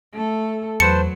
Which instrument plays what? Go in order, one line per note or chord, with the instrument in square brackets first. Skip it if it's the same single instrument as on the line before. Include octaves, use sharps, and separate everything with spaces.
[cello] A3 A4
[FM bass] E2 [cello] F#3 [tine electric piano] B4 C5 A5 [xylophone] C#7